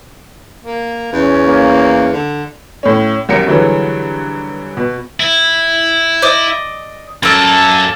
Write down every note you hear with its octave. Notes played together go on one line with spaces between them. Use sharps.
A#3
E2 C#4
A#3
D3
A2 C#4
C2 F#2 G4 A#4 G5 C#7
G2 D3 E3 F#3 G#3
B2
E4
D5 D#5
F#2 A#3 A4